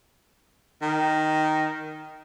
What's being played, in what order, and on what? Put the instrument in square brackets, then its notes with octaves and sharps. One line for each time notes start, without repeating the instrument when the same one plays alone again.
[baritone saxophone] D#3